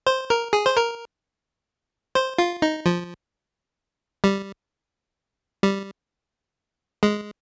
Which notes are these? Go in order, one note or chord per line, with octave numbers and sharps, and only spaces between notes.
C5
A#4
G#4
C5
A#4
C5
F4
D#4
F3
G3
G3
G#3